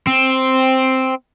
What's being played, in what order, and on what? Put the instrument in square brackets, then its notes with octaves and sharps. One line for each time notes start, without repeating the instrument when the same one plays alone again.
[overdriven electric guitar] C4